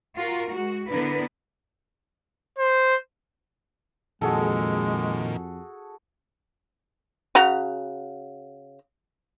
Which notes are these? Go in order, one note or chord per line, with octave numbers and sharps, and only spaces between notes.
F4 F#4 A#4
G#3 F#4
D3 B3 D4 E4 A#4 B4
C5
F2 A#2 D#3 G#3 F#4 G#4 A4
C#3 F#4 A#5